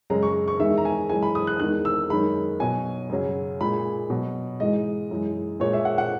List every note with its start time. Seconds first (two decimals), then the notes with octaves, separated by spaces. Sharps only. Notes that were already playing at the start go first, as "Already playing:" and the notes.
0.10 F#2 C#3 G#3 A#5
0.23 C#6
0.48 C#6
0.60 E2 D#3 G#3 E5
0.78 A#5
0.85 G#5
1.09 F#2 E3 G#3 G#5
1.23 B5
1.35 D#6
1.47 F#6
1.60 E2 D#3 G#3 F#6
1.85 E6
2.09 F#2 D#3 G#3 B5
2.60 B2 F#3 G#5
3.09 F#2 C#3 F#3
3.60 A#2 G#3 B5
4.10 B2 F#3
4.60 G#2 E3 G#3 D#5
5.11 F#2 E3 G#3
5.60 A#2 G#3 C#5
5.73 E5
5.85 F#5
5.98 F#5